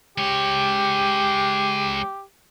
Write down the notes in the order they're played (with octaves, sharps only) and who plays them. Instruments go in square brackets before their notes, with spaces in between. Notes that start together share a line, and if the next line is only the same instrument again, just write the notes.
[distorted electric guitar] G#3 C#5 [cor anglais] G4